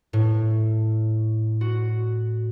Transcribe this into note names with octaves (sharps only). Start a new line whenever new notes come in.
A2
F#4